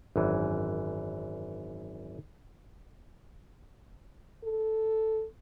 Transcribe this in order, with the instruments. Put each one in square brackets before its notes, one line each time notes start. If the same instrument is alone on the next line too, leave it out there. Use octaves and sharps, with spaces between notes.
[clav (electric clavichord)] G#1 F#2 E3
[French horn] A4